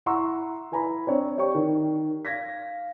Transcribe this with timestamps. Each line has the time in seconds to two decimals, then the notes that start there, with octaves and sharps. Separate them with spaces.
0.06 E4 F#5 A#5 C6 C#6 E6
0.72 E4 B4 G#5 A#5 B5
1.07 C4 D4 C#5
1.38 G4 C#5 D5 G5 C#6
1.55 D#3
2.25 F5 G#6 A#6 B6